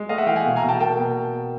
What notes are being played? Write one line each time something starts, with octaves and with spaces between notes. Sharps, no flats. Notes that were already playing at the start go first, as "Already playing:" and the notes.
Already playing: G#3
A3 D#5 F5
E5 F#5
E3 F5 G5
F#5 G#5
B2
G#5 A#5
B2
G5 A5
A#3 G5 A5
B2